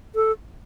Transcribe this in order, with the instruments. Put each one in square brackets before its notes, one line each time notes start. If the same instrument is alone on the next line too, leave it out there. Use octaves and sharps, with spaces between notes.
[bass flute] A4